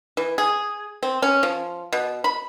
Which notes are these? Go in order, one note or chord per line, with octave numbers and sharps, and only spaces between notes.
E3
G#4
C4
C#4
F3
B2
B5